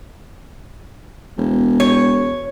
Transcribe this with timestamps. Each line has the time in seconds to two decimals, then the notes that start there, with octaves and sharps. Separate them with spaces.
1.38 E1
1.80 C#5